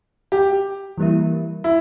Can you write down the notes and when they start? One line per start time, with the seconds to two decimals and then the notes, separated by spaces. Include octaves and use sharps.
0.32 G4
0.98 E3 G3 A#3 E4
1.64 E4